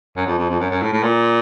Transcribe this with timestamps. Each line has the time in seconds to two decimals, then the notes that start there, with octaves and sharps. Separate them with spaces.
0.17 F#2
0.27 F2
0.38 F2
0.49 F2
0.60 F#2
0.71 F#2
0.82 A2
0.93 A2
1.03 A#2